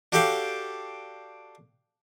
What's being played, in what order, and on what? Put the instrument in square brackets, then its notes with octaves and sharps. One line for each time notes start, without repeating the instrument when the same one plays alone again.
[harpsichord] D4 F#4 G4 A4 F5 G5